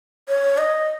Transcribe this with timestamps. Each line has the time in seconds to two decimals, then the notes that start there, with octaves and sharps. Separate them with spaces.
0.28 C#5
0.58 D#5